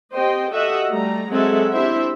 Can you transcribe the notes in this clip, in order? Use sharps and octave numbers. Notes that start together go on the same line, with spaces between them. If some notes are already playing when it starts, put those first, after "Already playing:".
C4 G4 C5 D#5 G5
F#4 G4 A4 D#5 E5 F#5
G3 A3 A#5
F#3 G#3 C4 A4 E5 F#5
C4 D4 E4 G4 C5 E5